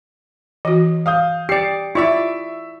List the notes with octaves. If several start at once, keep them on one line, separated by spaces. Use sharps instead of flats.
E3 F#4 D#5
F5 D#6 G6
G4 D5 C7 C#7
E4 F4 D5 E5 C#6